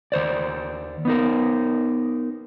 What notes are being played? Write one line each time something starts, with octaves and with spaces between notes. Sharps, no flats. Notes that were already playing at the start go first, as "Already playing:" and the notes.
D#2 C5 D5
B3 D#4 A#4